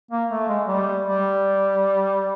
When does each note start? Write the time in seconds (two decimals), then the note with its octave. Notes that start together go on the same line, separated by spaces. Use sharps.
0.11 A#3
0.31 A3
0.49 G#3
0.68 G3
1.06 G3